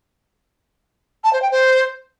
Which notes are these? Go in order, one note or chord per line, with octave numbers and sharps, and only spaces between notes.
A5
C5
G5
C5